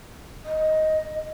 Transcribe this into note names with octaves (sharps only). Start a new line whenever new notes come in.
D#5